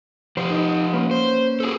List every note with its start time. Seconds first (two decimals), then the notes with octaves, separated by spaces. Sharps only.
0.37 F3 G4 C5
0.50 D#4
0.94 A#3 C#4 B4
1.11 C5
1.60 F#4 G#4 A4